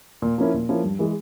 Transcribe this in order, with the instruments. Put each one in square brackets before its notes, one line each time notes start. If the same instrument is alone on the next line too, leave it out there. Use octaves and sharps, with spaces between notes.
[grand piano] A#2
F3 A#3 C#4 E4
A#2
F3 A#3 C#4 E4
G2
E3 G#3